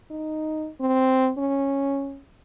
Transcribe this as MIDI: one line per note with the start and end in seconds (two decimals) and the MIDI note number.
0.10 0.69 63
0.80 1.31 60
1.38 2.20 61